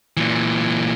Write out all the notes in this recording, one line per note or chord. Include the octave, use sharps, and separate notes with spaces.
A#2 E3